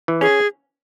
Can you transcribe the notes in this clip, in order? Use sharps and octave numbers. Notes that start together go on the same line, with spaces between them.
E3
C#4 G#4